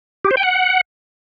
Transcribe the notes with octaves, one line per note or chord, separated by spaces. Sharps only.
G4
C5
G5
F#5